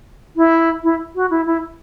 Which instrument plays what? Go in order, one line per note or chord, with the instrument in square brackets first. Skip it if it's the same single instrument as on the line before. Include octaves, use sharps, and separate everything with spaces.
[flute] E4
E4
F#4
E4
E4